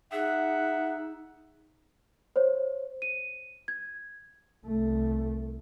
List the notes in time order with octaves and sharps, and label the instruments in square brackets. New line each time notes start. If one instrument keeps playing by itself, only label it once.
[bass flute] D#4 [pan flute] G#4 [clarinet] E5 [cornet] F#5
[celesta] C5 C#5
D#7
G#6
[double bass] C2 A3